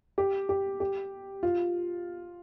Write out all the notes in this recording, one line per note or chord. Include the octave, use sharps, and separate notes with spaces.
G4
G4
G4
F4